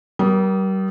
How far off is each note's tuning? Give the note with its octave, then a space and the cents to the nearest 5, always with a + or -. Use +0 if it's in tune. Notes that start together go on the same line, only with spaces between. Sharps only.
G3 -35 A#4 +30 D#6 +0